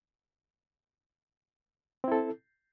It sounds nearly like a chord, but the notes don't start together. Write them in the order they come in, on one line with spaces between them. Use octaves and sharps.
C4 E4 A4